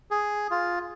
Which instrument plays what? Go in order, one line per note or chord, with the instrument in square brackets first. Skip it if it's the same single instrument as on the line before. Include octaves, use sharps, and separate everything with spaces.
[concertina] G#4
F4